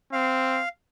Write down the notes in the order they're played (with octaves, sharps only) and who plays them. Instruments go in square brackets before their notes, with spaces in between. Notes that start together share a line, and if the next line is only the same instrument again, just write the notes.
[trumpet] C4 [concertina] F5